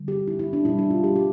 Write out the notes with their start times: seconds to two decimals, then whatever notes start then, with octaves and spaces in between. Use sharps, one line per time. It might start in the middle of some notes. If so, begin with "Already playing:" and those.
Already playing: D3 G3
0.08 G4
0.27 E4
0.39 E4
0.53 D4
0.65 B2 G3 E4
0.79 D4
0.90 F4
1.04 G4
1.16 G4